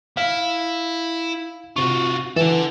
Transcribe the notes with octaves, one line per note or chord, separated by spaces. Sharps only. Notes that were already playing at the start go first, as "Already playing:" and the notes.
E4 F5
C3 F4 F#4 C#6
E3 A4 F#5